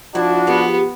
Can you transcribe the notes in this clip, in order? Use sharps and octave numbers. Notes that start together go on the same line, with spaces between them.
F3 D4 E4 F#4
G#3 B3 G4